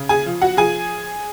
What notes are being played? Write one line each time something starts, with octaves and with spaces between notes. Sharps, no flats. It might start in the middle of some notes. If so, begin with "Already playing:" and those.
Already playing: C#3
G#4 G#5
F3
F#4 F#5
F3 G#4 G#5